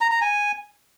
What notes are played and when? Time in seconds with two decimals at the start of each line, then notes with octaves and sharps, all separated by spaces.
0.01 A#5
0.11 A#5
0.21 G#5